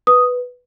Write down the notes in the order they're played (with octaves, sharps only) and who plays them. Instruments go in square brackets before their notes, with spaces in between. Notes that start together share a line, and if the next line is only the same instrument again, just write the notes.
[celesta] B4 D#6